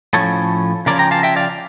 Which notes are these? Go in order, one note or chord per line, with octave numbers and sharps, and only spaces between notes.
A2 F3 C#4 A4 C#5
C#3 F3 C#4 A#4 D5
G5 A#5
F5 A5
E5 G5
D5 F5